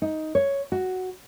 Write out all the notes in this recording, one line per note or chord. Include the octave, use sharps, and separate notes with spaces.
D#4
C#5
F#4